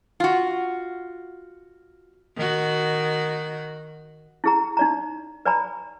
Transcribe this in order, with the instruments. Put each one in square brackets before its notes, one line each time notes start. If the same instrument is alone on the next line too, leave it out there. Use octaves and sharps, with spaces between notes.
[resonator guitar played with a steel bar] F4 F#4
[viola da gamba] D#3 F#4
[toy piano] E4 G#4 A#5
D#4 D5 A#5
B4 D5 G#5 A#5 B5